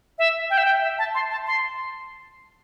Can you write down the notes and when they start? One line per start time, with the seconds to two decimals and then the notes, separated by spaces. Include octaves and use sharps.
0.19 E5
0.50 G5
0.58 E5
0.65 G5
0.82 E5
0.98 A5
1.14 C6
1.31 A5
1.47 C6